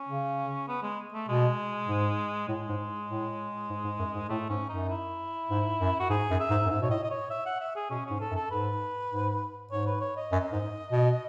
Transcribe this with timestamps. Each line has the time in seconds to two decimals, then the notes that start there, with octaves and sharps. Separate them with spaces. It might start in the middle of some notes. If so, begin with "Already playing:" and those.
Already playing: C#4
0.08 C#3
0.68 B3
0.83 G#3
1.13 A3
1.28 B2 G#3
1.88 G#2
2.48 A2 G#3
2.69 G#2
3.09 A2
3.69 G#2
3.84 G#2
3.99 F#2
4.14 G#2
4.29 A2 A3
4.49 G#2 C#4
4.69 F#2 D#4
4.89 E4
5.50 G#2
5.80 F#2
6.00 F#4
6.09 G#2 G#4
6.30 F#2
6.40 E5
6.50 G#2
6.66 F#2
6.71 G#2 E5
6.81 B2 C#5
6.90 A2 D#5
7.04 D#5
7.11 C#5
7.30 E5
7.46 F#5
7.60 E5
7.76 G#4
7.90 B2 C#4
8.06 G#2 C#4
8.20 A4
8.31 F#2
8.36 A4
8.51 G#2 B4
9.11 G#2
9.71 G#2 C#5
9.87 B4
10.01 C#5
10.17 D#5
10.32 F#2
10.52 G#2
10.92 B2